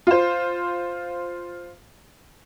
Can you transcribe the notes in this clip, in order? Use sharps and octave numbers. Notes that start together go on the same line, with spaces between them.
F4 C5